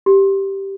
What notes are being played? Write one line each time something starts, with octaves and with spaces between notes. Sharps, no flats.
G4